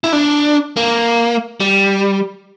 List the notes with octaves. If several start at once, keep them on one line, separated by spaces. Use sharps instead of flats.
E4
D4
A#3
G3